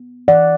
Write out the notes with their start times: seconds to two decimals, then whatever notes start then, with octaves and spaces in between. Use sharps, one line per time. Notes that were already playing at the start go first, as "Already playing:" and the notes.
Already playing: B3
0.28 E3 D5 F#5